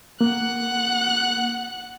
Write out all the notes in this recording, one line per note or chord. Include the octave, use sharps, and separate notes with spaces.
A#3 F#5 F#6